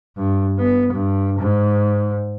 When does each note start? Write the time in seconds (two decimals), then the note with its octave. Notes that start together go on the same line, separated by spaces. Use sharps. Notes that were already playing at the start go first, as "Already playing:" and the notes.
0.17 G2
0.59 B3
0.93 G2
1.39 G#2